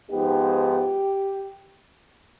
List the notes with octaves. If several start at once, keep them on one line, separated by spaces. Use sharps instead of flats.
G#2 F3 B3 D#4 G4